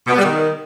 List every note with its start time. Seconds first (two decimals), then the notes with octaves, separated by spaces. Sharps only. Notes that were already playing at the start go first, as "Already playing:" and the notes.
0.07 B2
0.13 B3
0.18 G3
0.23 D#3